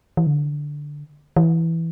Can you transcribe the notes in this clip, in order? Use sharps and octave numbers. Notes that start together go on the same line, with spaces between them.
E3
D3
E3